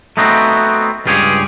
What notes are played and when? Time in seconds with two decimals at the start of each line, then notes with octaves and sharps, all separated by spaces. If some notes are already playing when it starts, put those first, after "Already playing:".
0.17 A3 B3 C4 D#4 F#4
1.06 C#2 G2 F4 G4 G#4 C#5